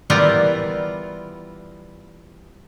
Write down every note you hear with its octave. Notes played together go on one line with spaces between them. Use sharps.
E3 G3 B3 F4 A#4 D5